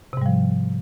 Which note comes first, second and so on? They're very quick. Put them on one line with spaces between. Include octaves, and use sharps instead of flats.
C3 G#2 G3 F3